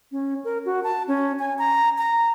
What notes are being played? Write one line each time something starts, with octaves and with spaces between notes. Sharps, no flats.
C#4
A#4
F#4
A5
C#4
G#5
A#5
A#5